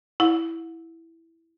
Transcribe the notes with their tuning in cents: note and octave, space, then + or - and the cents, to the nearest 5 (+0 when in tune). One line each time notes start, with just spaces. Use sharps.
E4 +0 F#5 -35